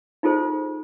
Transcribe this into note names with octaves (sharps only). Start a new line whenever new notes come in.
D#4 F4 G#4 A4 C5